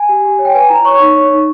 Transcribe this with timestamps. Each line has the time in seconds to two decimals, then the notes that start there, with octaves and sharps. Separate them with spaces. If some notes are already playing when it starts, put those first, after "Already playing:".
Already playing: G#5
0.09 G4
0.25 G4
0.39 C#5
0.45 G5
0.54 B4 G#5
0.69 E4 A#5
0.85 C#5 C#6
1.00 D#4
1.16 C#5
1.30 D#4